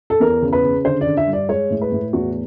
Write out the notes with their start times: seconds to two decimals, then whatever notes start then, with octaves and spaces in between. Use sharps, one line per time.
0.10 A4
0.20 E2 A#4
0.42 C#3
0.53 B4
0.63 C#3
0.85 D3 C5
1.01 D5
1.07 D3
1.17 E5
1.27 G2
1.33 D5
1.49 G#3 C#5
1.70 A2
1.82 B4
1.92 A2
2.13 E2 F#4